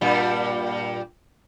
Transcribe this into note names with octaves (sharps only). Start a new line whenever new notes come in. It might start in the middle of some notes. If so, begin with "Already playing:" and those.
G2 A#2 G3